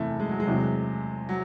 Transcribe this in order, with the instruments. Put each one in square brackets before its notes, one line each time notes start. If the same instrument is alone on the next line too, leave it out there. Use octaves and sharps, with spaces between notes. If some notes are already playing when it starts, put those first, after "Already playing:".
Already playing: [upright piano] F#1 E2 C3 E3 [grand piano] A3
[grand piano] G#3
F#3
G#3
[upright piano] E2 C3 F#3
[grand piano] F#3